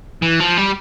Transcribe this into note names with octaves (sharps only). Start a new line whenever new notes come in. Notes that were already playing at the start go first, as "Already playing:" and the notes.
E3
F3
G3